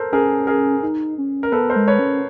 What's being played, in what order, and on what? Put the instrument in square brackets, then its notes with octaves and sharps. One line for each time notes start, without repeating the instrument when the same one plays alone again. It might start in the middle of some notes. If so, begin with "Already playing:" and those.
Already playing: [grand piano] A4 A#4 C5
[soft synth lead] C#4 [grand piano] G#4 A#4
[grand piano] G#4 A#4
[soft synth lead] D#4
C#4
[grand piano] A#4
[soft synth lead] B3 [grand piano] A4 B4
[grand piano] A#4 C5
[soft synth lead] G#3
[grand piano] B4 C#5
[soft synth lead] C#4